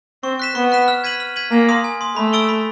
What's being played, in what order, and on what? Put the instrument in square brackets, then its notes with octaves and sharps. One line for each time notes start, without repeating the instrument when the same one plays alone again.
[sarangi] C4 [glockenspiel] C#6
[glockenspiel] F#6 B6 E7
[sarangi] B3 [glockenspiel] C#6
[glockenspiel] F#6 B6 E7
F6
G#6 B6 D#7 F#7
F6
G#6 B6 D#7 F#7
[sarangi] A#3 [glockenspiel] G#5
[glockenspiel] C6 D#6
G#5
C6 D#6
[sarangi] A3 [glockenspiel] B5
[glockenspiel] E6 A6 D7 G7
B5